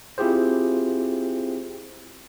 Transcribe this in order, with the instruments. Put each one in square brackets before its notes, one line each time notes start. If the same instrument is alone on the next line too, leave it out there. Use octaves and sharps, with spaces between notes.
[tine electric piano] C4 E4 F4 G4 G#4 C5